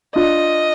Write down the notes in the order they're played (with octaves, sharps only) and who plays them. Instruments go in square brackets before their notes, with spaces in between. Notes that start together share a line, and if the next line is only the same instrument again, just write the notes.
[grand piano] D4 F4 [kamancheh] D#5